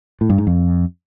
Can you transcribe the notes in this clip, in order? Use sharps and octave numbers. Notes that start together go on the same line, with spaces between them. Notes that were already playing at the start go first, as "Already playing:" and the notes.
A2
G2
G#2
F2